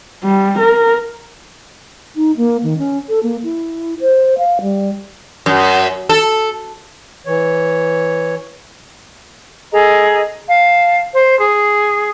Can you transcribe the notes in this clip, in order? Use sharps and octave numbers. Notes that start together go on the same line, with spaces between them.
G3
A#4
D#4
A#3
D#3
C#4
A4
A#3
E4
C5
F5
G3
F#2
A4
E3 C#5
G#4 A4 D#5 A#5
F5 A5
C5
G#4